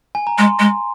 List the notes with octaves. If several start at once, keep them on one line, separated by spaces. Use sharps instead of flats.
G#5
A#5
G#3 C6
G#3